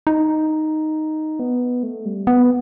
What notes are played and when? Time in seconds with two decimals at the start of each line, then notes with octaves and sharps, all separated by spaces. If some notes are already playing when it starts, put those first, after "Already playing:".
0.07 D#4
1.39 B3
1.83 A3
2.05 G3
2.27 B3